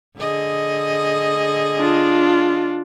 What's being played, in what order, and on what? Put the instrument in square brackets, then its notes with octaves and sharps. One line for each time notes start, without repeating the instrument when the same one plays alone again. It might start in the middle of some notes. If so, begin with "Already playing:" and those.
[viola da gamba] D3 G#4 D#5
[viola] D4 F4